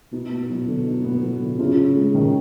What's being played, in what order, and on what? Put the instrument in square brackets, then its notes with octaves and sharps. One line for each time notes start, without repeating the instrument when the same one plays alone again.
[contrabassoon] B2 [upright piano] D#4
[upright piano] B3
F#3
D3
D#4
B3
F#3
D3
[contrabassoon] C#3 [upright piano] F4
[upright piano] C#4
G#3
D#3